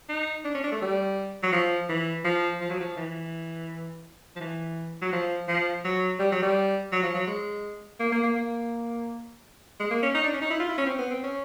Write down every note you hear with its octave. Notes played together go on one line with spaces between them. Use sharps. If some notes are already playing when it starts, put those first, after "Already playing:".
D#4
D4
C#4
D4
A3
G3
F#3
F3
E3
F3
F3
F#3
F3
E3
F3
E3
F#3
F3
F3
F#3
G3
F#3
G3
F#3
F3
F#3
G#3
A#3
A#3
A#3
A#3
G#3
A#3
C#4
D#4
D4
C#4
D#4
E4
F4
E4
C#4
C4
B3
C4
C#4